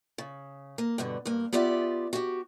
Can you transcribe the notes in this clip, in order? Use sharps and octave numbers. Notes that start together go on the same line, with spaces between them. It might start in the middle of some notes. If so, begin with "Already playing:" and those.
C#3
A#3
G2 B2 D3
G2 A#3
B3 F4 G4 D5 E5
F#4 G4